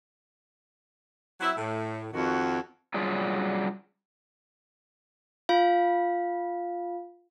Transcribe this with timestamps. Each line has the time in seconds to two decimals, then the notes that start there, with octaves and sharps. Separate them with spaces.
1.40 F#3 C4 E4
1.57 A2
2.14 F2 D#3 F#4
2.94 F#3 G3 C#4 D4 F4 G#4
5.49 F4 F5